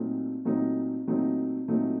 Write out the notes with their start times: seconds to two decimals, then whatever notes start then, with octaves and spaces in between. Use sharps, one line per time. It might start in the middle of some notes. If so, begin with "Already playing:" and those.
Already playing: A#2 F#3 A3 C4 D#4
0.45 A#2 F#3 A3 C4 D#4
1.07 A#2 F#3 A3 C4 D#4
1.68 A#2 F#3 A3 C4 D#4